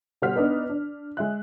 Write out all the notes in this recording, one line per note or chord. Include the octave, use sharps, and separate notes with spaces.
B2 G3 C5 F#5 F6 B6
B3 D4 D#4 B4
D4
G#3 E5 F#6